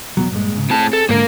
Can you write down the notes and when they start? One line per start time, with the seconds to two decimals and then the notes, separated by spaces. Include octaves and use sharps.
0.17 E2 B2 F#3
0.32 G2 A#2 G#3
0.55 G#2 C#3
0.70 A2 C4 G#4 A5
0.93 A4
1.09 G#2 D3 A#3 A#4